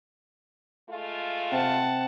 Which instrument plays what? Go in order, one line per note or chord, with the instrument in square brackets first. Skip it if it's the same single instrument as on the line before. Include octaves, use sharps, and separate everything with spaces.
[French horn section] G#3 A3 F4
[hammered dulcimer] C3 [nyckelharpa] F#5 A5